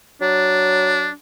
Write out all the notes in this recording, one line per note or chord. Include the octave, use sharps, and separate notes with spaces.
F#3 D4